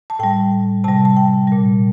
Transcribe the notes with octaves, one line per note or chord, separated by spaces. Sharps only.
A5
A2 G3 G5
C3 G3 A5
A5
G5
A#2 G3